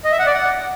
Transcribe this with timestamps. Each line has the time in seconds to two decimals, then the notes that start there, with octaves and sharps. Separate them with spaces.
0.04 D#5
0.12 E5
0.19 F#5
0.26 D5
0.34 F#5